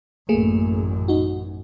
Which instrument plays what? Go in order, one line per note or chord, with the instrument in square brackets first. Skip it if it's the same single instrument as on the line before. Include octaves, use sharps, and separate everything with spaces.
[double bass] A1 F#2 [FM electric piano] A3 A#3 G#4
[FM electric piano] D#4 F#4